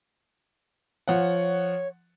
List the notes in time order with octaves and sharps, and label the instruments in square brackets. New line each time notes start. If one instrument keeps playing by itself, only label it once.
[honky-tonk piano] F3 F#5 [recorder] C#5